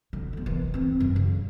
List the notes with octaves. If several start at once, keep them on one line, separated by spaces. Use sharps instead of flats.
D3
D3 B3
D#3 E3
E3 C4
F#2
C#3